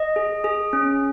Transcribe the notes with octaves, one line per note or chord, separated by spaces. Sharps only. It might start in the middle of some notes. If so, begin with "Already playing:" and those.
Already playing: D#5
G#4
G#4
C#4